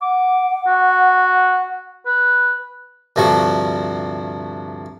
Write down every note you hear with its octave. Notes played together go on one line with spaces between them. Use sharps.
F#5 D6
F#4
B4
D2 G2 C3 F3 G3 C#6